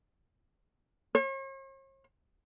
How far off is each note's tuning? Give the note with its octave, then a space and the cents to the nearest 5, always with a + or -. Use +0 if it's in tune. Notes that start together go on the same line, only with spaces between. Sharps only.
C#5 -45